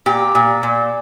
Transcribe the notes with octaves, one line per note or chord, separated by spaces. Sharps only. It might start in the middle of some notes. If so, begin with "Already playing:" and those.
A#2 G4
A#2
A#2